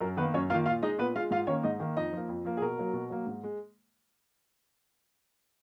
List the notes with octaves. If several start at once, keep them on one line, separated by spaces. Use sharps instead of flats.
F#2 A#4
D#3 A#3 B3 B4
F#2 C#4 C#5
D#3 A#3 F4 F5
A#2 F4 F5
G#3 D#4 D#5
A#2 B3 B4
G#3 F4 F5
G#2 F4 F5
D#3 A#3 C#4 C#5
G#2 D#4 D#5
D#3 A#3
F2 D#4 D#5
F3 A#3
F2
F3 A#3
G#4
B2 A#4
F#3 A#3
B2
F#3 A#3
G#2
G#3